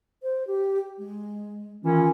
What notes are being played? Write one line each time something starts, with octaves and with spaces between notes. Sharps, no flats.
C5
G4
G#3
D#3 E3 C#4 F4